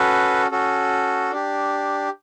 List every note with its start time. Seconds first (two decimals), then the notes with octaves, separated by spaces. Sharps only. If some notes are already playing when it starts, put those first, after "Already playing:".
Already playing: C#4 F#4 A4 B4
0.51 C#4 F#4 A4
1.31 D4 G4